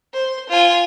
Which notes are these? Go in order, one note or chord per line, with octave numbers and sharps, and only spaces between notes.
C5
F4 G#5